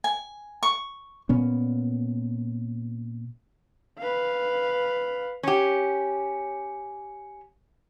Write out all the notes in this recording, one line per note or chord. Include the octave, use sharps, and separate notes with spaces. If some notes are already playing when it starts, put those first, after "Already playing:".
G#5
C#6
A#2 B3 C#4
B4 F5
C#4 G4